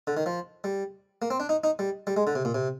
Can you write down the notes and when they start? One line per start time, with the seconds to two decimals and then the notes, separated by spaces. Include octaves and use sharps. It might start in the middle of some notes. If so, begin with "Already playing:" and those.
0.07 D3
0.17 D#3
0.26 F3
0.64 G3
1.22 A#3
1.30 C4
1.40 D4
1.49 D#4
1.64 D#4
1.79 G3
2.07 G3
2.17 G#3
2.27 D3
2.35 C3
2.45 A#2
2.55 C3